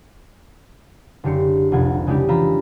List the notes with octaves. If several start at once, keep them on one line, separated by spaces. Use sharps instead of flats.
F#1 D3 G4 C7 C#7
F1 C2 F4 F#5 G#6
C#3 G#3 C#4 D4 E4 G4
E3 F4 E5 A#5 B5